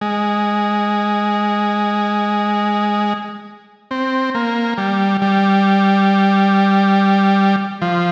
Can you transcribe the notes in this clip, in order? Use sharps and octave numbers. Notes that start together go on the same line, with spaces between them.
G#3
C4
A#3
G3
G3
F3